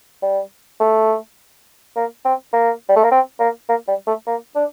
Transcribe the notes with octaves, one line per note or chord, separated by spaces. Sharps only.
G3
A3
A#3
C4
A#3
G3
A3
A#3
C4
A#3
A#3
G3
A3
A#3
D4